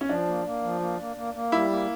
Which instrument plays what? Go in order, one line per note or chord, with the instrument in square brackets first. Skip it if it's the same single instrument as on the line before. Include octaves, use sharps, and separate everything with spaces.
[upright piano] C#4
[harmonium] F3 [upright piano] D4
[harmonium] A#3
A#3
F3
A#3
A#3
A#3
A#3
[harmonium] G3 [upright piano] E4
[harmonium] A#3